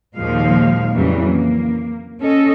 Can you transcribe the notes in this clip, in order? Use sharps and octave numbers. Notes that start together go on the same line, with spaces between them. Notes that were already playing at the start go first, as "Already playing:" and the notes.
D#2 A#2 F3 G#3 A#3 F5
F2 C#3 E3 F#3 G3
A#3
C#4 A4 D#5